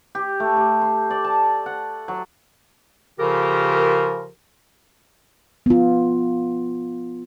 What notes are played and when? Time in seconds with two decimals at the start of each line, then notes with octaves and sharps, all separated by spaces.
0.15 G4
0.40 A3
0.57 G4
0.81 C6
1.10 D5
1.24 A5
1.66 F#5
2.08 F#3
3.19 C#3 F3 F4 G4 A4 A#4
5.66 B3 F4